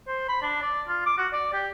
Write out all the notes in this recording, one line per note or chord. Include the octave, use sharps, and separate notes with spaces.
C5
B5
D4
D5
F4
D6
F#4
D5
G4